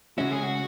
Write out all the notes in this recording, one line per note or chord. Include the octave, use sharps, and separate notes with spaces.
C#3 G#3 C#4 E4 F#4
G#4
F#4